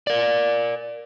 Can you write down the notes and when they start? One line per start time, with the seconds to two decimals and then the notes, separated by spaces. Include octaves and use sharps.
0.07 A#4 D5